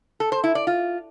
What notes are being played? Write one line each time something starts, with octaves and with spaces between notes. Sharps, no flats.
A4
C5
E4
D5
F4